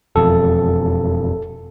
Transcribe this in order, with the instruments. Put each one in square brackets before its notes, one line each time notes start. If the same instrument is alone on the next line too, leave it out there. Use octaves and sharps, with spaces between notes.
[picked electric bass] E1 F2 [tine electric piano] A4